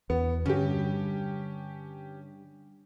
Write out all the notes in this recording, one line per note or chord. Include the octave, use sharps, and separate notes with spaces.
E2 B3
G2 D3 C#4 G4